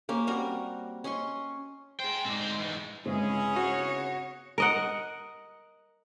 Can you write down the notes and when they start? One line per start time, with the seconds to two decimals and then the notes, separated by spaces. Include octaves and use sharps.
0.09 A#3 C#4 G4
0.27 G3 C4 F#4 A#4
1.04 C#4 D#5 C6 C#6
2.00 G#4 C5 G5
2.25 G#2 C4 D#4 D5
2.40 D2 C5
2.59 E3 G#3
3.05 G1 C#3 G#3 C4 C#4 E4 G#4
3.56 F#4 C#5
4.58 A#4 D#5 F#5